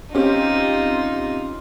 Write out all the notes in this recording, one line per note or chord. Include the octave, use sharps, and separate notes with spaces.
C4 C#4 D#4 F4 G4